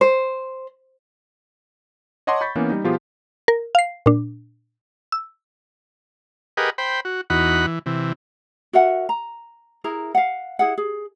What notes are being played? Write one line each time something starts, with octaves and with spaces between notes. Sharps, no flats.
C5
C#5 D#5 F#5 A5 C6 D6
B5 C#6 G6 A6 B6
E3 A#3 B3 C#4
G3 D#4
B2 F3 B3 F4 G4 G#4
A#4
F5 C7
A#2 D4
E6
G4 G#4 A#4 B4 D#5 F#5
C5 G5 B5
F#4
E2 D#4 F#4 F#5 B5
E3
C3 E3
F#4 A#4 E5 F#5
A#5
E4 G#4 A#4 A#5
F5 F#5
E4 G#4 F#5
G#4